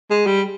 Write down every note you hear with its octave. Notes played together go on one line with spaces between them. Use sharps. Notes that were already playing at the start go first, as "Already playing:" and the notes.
G#3
G3